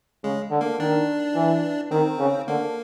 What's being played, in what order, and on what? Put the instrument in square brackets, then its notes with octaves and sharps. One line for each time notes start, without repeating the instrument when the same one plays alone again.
[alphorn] C#3 [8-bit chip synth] G#3
[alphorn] D3
[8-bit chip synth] A#3
[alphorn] D#3 [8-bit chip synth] D4
[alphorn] E3
[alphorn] D#3 [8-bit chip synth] C4
[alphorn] C#3
[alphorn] D3 [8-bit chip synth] A#3